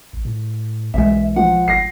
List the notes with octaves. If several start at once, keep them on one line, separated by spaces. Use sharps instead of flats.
A1
A2
B1 E3 G#3 E5
F3 F#5
G1 A#6 C7